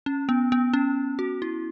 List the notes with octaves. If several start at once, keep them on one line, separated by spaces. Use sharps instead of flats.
C#4
B3
B3
C#4
F#4
E4